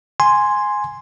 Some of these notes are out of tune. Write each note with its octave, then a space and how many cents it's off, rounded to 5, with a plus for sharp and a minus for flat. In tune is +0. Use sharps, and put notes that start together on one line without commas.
G#5 +0 C6 +0